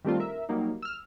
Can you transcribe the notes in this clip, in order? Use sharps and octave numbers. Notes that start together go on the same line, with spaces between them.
D#3 G3 A3 C4 D4 F4
A#4 E5
F#3 G3 A#3 D#4
E6 F6